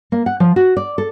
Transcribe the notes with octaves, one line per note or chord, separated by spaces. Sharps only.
A#3
F#5
F3
F#4
D5
A4